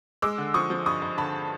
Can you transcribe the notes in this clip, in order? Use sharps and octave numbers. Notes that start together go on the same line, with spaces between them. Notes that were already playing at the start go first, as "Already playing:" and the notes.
G#3 D6 E6
D3
F3 C#6 D#6
F3
G2 C#6 D#6
G2
D3 A5 B5